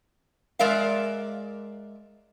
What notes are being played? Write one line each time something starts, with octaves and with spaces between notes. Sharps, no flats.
G#3 A#4 D5 E5 F5